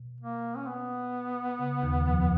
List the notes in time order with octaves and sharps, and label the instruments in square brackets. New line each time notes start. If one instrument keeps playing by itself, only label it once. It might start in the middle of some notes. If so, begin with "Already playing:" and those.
Already playing: [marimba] B2
[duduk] A#3
C#4
B3
[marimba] C#3
D#2 D#3
F2 F3